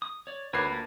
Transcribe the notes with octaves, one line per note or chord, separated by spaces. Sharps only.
D#6
C#5 D5
D2 A#4 B4 C#5 C7
A#3 D4 F4